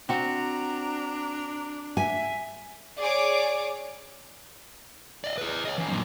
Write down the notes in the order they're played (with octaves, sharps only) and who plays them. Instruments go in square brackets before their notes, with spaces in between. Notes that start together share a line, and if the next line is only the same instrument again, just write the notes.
[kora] C4 F#4 [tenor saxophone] D4 [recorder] A#5
[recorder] E5 [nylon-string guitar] G#5
[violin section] G#4 C#5 D6 [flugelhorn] D5
[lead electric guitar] D5 D#5
G#4 B4
C#5 D#5
E3 C#4
F#2 A#2